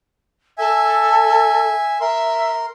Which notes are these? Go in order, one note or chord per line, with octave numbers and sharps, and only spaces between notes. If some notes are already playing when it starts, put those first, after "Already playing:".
A4 E5 G#5
A#4 E5 C6